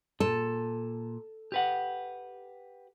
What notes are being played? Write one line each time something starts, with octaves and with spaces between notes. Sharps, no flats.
A#2 A4
G4 B4 F#5